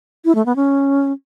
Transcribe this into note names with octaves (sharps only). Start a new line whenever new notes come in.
E4
A3
B3
C#4